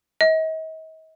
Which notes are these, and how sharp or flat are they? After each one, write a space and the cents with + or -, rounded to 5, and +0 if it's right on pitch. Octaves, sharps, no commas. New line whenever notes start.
D#5 +40